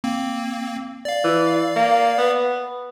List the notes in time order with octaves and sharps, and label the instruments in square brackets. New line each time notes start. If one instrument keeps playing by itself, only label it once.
[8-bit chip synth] A#3 C4
D5 F5
[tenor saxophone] E3
A#3
B3